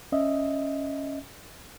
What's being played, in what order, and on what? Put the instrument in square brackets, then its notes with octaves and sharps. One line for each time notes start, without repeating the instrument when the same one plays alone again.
[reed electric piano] C#4 D#5 E5